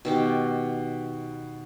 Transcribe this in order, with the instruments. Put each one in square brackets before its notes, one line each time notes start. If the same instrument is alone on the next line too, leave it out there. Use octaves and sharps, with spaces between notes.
[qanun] B2 D#3 G4